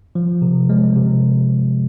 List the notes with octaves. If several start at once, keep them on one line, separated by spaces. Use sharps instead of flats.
F3
C3
G#3
C3